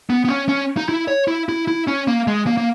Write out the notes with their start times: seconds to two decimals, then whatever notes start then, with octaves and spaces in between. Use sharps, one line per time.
0.10 B3
0.25 B3
0.28 C#4
0.49 C#4
0.77 D#4
0.89 E4
1.08 C#5
1.28 E4
1.49 E4
1.68 E4
1.88 C#4
2.07 A#3
2.27 G#3
2.47 A#3
2.57 A#3